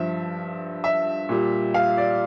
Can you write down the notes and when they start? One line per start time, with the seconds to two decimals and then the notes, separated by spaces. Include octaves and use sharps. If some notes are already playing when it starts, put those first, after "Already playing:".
Already playing: G2 F3 E5
0.84 E5
1.29 A#2 G3
1.74 F5
1.98 D5